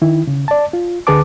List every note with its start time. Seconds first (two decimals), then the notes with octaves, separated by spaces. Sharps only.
0.02 D#3 E4
0.27 C#3
0.48 D5 A5
0.73 F4
1.07 D2 D3 G#4 B4 A5 D6